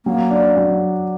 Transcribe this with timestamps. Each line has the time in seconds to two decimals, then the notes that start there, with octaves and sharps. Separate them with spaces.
0.05 F#3 A#3
0.31 D4
0.57 F#3